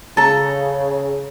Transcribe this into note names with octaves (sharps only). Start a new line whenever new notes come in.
C#3 A4 A#5